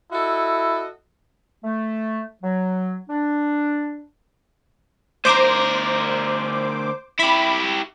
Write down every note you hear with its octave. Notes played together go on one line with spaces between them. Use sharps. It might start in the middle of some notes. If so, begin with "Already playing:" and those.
E4 F#4 A4 D#5
A3
F#3
D4
D2 A#4 C5 D6
E4 G4 B5